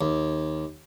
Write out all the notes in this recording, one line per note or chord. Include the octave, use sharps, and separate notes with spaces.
D#2